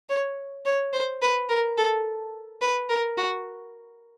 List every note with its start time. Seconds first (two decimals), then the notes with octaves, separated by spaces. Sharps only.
0.09 C#5
0.66 C#5
0.93 C5
1.22 B4
1.49 A#4
1.78 A4
2.62 B4
2.90 A#4
3.17 F#4